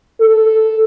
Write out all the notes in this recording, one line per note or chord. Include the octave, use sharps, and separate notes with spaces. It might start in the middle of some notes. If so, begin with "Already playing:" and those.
A4